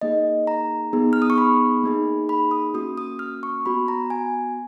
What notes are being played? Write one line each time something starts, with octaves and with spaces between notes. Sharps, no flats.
A#3 D#4 G#4 D#5
A#5
B3 D#4 G#4
F6
D#6
C#6
B5
A#3 D#4 G#4
B5
D#6
A#3 C#4 F#4 D#6
D#6
F6
C#6
B3 F#4 B5
A#5
G#5